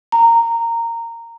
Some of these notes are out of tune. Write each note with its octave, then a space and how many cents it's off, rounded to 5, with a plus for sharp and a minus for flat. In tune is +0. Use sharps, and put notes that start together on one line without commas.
A#5 -15